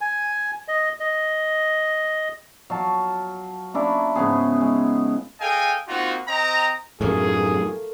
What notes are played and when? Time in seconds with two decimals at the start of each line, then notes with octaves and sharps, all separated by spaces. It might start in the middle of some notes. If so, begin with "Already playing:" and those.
0.01 G#5
0.68 D#5
1.00 D#5
2.70 F#3 F5 A5
3.74 A#3 C#4 D4 E4
4.15 G#2 C#3 B3 G#4
4.61 G#3
5.41 G#4 A4 D#5 F5 G5 G#5
5.89 A#3 C4 D#4 F4 F#4
6.28 C4 D#5 G5 A#5
7.01 F#2 A2 A3 A#3 G#4